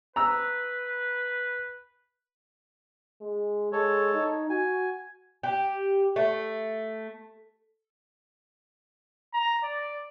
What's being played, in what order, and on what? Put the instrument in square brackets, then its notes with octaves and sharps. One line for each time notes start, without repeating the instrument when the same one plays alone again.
[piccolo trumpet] B4 [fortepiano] A#5 E6
[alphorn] G#3
[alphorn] G#3 [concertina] A4 C#5
[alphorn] D#4
[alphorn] F#4 [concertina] G#5
[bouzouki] G4
A3
[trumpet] A#5
D5